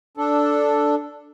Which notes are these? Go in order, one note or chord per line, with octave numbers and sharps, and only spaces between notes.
D4 A4